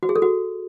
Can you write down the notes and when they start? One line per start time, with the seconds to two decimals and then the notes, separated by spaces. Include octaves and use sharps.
0.03 F#4
0.09 G#4
0.16 A4
0.22 F#4